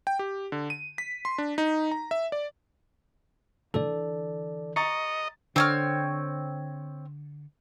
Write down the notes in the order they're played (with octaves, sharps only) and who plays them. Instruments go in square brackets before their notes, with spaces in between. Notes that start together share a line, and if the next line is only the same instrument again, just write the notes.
[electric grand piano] G5
G4
D3
D#7
B6
C6
D4
D#4
A#5
E5
D5
[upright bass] D3 E3 [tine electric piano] A4 D5
[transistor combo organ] D#5 [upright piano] A#5 C#6 A6 [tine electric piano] C#7
[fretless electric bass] D3 [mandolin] C4 C#5 F6